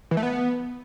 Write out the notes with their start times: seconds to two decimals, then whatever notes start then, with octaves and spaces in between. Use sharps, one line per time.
0.11 E3
0.17 A3
0.23 B3